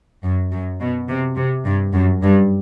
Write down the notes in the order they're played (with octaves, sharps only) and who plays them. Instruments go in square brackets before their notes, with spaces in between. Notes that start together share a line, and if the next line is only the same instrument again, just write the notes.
[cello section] F#2
F#2
B2
C3
C3
G2
F#2
G2